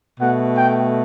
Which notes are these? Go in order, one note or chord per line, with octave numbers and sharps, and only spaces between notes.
B2 A3 F#5
G5